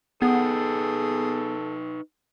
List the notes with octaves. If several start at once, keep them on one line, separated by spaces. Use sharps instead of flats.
B3 D#4 G#4 A4 B4 G5